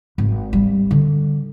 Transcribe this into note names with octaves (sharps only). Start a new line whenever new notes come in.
G#1
G3
D3